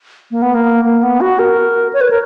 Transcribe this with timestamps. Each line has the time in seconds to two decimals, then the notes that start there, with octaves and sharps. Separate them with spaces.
0.31 A#3
0.42 B3
0.54 A#3
0.85 A#3
1.03 B3
1.21 F#4
1.39 A#4
1.93 C#5
2.01 B4
2.10 A#4